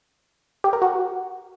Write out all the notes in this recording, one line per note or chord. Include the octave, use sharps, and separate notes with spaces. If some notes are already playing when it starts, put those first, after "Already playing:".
G4
A#4
F#4